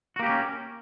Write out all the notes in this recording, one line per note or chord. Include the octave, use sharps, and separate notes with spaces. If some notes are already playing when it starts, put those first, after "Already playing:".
A#3 B3 C#4 F#4 G4